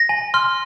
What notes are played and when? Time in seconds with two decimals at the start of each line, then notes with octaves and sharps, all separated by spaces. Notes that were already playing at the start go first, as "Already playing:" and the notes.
Already playing: A#6
0.09 G#5
0.34 C6 F6